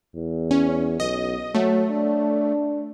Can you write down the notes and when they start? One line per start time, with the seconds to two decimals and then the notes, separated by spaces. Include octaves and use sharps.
0.15 E2
0.51 C#4
1.00 B1 D#5
1.55 F#3 A3
1.91 D4